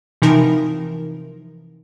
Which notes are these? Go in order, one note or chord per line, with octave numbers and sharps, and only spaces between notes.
C3 E3 F3 D#4 A#4